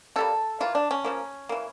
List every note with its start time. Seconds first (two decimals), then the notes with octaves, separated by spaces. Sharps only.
0.16 C#3 G3 A#3 A4
0.60 E3 A#3 F4
0.75 D4
0.91 C#4
1.04 C#3 F3 A#3
1.49 E3 A#3